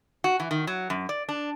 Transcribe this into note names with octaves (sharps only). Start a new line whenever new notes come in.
F#4
E3
D#3
F#3
F#2
D5
D4